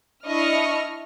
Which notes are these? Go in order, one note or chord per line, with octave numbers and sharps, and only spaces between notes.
D4 E4 D#5 C#6 F6